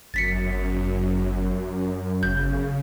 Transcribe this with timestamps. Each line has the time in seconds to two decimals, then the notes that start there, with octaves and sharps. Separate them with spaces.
0.14 G1 F#2 A6 B6 C#7
2.23 G1 C#3 G6